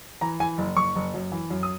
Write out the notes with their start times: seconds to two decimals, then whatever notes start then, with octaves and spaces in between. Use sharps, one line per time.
0.21 E3 A#5
0.40 E3 G#5
0.58 F#1
0.76 F#1 C#6
0.96 F#1
1.14 F#2
1.32 E3
1.50 F#2
1.63 D#6